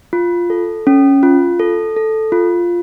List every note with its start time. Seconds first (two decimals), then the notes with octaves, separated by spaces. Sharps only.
0.13 F4
0.50 A4
0.87 C#4
1.23 F4
1.59 A4
1.96 A4
2.32 F4